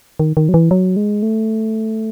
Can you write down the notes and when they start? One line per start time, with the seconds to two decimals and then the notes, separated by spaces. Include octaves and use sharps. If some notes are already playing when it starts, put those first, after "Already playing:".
0.20 D#3
0.37 D#3
0.49 F#3
0.54 E3
0.71 F#3
0.96 G#3
1.23 A3